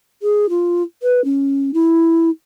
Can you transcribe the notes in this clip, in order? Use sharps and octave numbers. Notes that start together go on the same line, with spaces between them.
G#4
F4
B4
C#4
E4